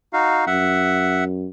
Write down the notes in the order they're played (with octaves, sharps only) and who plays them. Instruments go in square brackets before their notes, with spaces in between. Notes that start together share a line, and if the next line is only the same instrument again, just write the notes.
[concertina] D#4 F#4 F5
[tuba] F#2 [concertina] E5 F#5